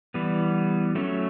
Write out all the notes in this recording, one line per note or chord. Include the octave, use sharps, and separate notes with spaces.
E3 G3 B3
F#3 A3 C#4